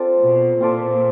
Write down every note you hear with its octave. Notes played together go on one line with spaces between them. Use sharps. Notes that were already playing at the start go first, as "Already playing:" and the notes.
Already playing: C4 F4 A4 D5
B2
A#2 C4 F4 A4 D5